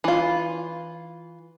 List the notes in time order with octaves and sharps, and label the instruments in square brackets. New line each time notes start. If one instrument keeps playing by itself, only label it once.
[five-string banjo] E3 F4